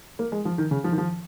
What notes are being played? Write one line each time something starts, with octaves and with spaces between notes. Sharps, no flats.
A#3
G#3
F3
D#3
C#3
F3
D#3
F3